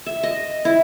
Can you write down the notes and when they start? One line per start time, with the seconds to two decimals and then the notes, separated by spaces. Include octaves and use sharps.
0.06 E5
0.23 D#5
0.65 E4